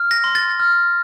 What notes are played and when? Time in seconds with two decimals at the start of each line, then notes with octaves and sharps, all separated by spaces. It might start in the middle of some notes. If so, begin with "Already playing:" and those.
Already playing: F6
0.11 A#6
0.24 C6
0.35 A6
0.60 F6